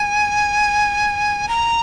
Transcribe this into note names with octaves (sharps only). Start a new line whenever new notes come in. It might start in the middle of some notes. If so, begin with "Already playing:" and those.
Already playing: G#5
A#5